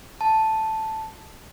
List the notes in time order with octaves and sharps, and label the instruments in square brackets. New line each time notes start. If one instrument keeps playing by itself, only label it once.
[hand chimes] A5